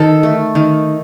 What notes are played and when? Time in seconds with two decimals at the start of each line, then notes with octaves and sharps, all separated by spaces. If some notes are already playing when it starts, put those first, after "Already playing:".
Already playing: D#3 A4
0.23 A3
0.55 D#3